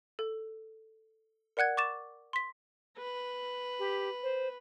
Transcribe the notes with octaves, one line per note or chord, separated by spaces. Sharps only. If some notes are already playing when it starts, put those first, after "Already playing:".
A4
A#4 D5 F#5 F#6 G#6
C#6 D6 A6 E7
C6 B6
B4
G4
C5